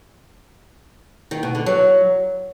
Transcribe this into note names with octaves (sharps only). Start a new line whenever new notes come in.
D#3
B2
D3
F#3